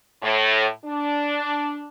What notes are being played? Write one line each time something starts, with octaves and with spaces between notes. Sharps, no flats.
A2
D4